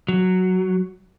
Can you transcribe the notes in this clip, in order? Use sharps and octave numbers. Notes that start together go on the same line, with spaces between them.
F#3